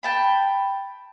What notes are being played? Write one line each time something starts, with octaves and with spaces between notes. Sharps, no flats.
G5 A5 B5